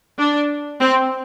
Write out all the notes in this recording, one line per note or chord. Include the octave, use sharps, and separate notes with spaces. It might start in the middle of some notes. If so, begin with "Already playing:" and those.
D4
C4